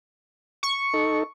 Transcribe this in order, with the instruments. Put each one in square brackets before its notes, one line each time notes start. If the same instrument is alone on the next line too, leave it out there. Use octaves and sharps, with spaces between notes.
[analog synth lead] C#6
[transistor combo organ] D#4 A4